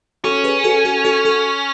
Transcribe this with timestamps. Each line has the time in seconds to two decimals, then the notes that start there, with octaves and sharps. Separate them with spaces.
0.24 C#4 F#4 A4
0.44 G#4 B4
0.64 F#4 A4
0.85 F#4 A4
1.05 F#4 A4
1.25 F#4 A4